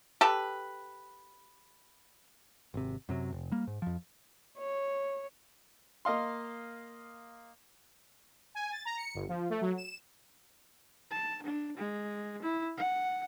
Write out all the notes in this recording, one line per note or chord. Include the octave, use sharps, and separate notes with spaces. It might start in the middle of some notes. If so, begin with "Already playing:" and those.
G4 A4 B4
G#1 C3
F#2 C3 F#3
F1
G3 A#3
G#2
F2 F3
C#5
A#3 D#5 F5 C6
G#5
A6
A#5
C#7
G1
F3
A3
F#3
E7
A5
D4
G#3
E4
F#5